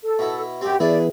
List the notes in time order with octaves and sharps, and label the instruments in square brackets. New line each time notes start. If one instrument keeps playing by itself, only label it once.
[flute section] A4
[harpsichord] B2 E4
[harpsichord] F#2 C4 [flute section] G4
[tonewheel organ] E3 B3 [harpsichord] E4 G#4 [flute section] D5